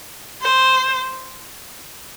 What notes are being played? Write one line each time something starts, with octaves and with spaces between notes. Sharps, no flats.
C5